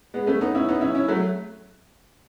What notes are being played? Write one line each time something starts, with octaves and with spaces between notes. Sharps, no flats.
G#3 B3
A3 C#4
B3 D#4
C#4 E4
B3 D#4
C#4 E4
C#4 E4
F#3 A3